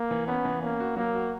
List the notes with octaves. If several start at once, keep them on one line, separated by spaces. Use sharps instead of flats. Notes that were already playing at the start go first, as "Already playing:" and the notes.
Already playing: A#3
E3
B3 C#4
E3
A#3 C#4
F#4
F#3 A#3
F#4